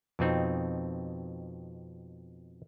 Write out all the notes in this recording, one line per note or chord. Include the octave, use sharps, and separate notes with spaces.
F2 B2 C4 D#4